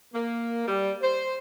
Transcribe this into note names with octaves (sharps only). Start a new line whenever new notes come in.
A#3
G3
C5